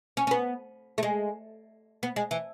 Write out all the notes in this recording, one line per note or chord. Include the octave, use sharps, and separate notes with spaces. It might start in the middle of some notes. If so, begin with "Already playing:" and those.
C#4
C#4
B3
A3
G#3
B3
G#3
E3